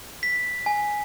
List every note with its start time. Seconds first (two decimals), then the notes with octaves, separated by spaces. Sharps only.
0.23 B6
0.66 G#5